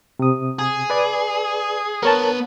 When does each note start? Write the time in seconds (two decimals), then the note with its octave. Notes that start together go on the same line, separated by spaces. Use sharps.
0.19 C3 D#6
0.59 G#4
0.90 B4 D5
2.03 B3 A#4 C#5 A5